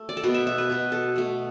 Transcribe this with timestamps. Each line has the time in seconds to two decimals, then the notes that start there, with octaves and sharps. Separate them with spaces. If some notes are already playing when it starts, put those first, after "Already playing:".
Already playing: A3
0.09 D5
0.17 A4
0.24 B2 B3 B4
0.34 E5
0.47 E5
0.58 B4
0.70 B2 B3
0.92 A4
1.16 B2 A3